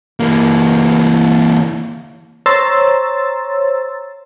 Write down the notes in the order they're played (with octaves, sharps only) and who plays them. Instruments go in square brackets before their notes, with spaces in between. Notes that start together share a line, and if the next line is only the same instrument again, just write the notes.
[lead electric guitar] E3 A#3
[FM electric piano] C5 C#5 A#5 C6 E6 A6